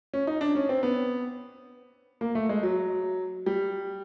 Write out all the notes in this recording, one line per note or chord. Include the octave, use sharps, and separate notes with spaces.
C#4
D#4
D4
C#4
C4
B3
A#3
A3
G#3
F#3
G3